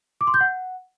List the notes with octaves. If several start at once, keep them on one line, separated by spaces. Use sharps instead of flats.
D6
C6
G6
F#5